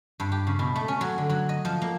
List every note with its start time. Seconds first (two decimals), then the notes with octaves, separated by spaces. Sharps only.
0.20 G2
0.32 G4
0.47 C#3
0.59 B2
0.76 A3
0.88 C#4
1.01 F#3
1.18 D3
1.29 F#3
1.49 D#5
1.65 F3
1.82 A#3